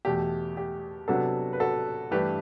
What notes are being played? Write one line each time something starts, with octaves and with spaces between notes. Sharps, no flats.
E2 B2 A3 G4
G4
C3 F#3 B3 D4 F#4 A4
B4
F#4 A4
G2 E3 A3 D4 G4 B4